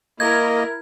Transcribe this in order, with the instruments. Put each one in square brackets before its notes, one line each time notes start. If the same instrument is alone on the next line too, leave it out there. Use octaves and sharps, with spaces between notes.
[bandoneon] A#3 D#5 [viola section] E4 A#4 [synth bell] G#6